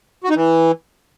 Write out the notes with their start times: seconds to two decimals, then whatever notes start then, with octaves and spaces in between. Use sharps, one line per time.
0.24 F#4
0.30 D#4
0.35 E3